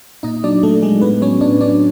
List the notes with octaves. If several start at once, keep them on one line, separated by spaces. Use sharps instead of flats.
A#2 D#4 D#5
F#3 D4 D5
A#2 A3 A4
F#3 G#3 G#4
A2 B3 B4
F#3 C#4 C#5
A2 D4 D5
F#3 D4 D5